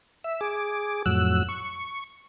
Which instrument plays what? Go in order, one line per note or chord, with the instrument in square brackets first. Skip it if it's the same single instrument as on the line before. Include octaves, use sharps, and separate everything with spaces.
[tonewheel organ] E5
G#4 D6
F2 A2 F#3 E6 F#6
C#6